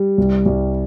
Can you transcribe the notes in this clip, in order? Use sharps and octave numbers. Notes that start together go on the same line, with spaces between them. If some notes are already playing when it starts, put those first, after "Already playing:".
Already playing: G3
C2
C2